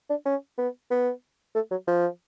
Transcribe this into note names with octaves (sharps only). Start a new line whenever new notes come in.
D4
C#4
B3
B3
A3
F#3
F3